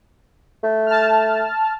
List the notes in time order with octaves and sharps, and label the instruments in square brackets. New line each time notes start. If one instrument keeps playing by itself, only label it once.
[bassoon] A3
[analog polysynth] A5 F6